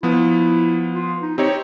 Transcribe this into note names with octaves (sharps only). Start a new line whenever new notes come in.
F3 B3 E4
F4
D#4
C4 D#4 G4 C#5